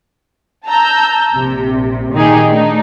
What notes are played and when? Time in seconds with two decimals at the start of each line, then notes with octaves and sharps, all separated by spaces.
0.66 A5 A#5 E6 G6
1.34 A#1 C3
2.13 A#2 D#3 D#4 G4 G#4
2.48 A3 D4 D#4